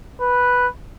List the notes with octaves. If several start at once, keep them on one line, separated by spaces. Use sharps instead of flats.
B4